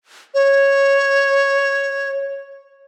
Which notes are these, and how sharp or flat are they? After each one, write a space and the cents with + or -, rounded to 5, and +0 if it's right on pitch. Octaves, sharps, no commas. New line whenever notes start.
C#5 -5